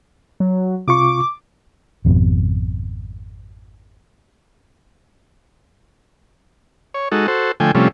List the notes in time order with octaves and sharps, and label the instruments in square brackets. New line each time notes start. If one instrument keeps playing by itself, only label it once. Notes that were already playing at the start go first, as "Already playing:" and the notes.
[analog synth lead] F#3
[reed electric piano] C3 F4 C#6 [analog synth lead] D6
[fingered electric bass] G#1 F2 B2
[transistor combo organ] C#5
G#3 D#4 F#4 A4
F#4 A4 C5
D3 F3 A3 G5 G#5
C3 F3 G3 A3 C#4